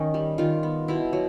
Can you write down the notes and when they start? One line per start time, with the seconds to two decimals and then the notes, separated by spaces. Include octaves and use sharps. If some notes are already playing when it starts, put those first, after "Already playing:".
Already playing: D#3 C#4 D#4
0.14 G3
0.38 D#3 F4
0.63 B3
0.88 B2 E4
1.13 F#3